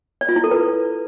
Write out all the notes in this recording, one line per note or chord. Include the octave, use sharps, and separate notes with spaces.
D5
F4
E4
A4
B4